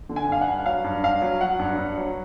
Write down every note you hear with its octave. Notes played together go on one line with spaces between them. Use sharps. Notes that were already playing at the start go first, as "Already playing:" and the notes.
D3
G#5
G2 F5
F#5
G2
F#3 F5
G2
G2 F5
F#3
F#3 F#5
G2
G2
F#3